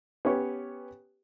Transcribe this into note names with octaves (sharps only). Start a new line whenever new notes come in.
B3 C#4 G4 C#5